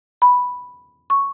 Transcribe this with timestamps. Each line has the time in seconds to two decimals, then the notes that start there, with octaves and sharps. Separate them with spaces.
0.22 B5
1.10 C#6